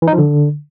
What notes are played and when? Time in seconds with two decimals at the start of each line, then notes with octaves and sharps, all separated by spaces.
0.02 E3
0.08 D#4
0.13 F3
0.18 D3